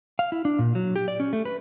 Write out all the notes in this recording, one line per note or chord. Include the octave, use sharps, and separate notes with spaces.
F5
E4
D4
A#2
F#3
G4
D5
C#4
A3
B4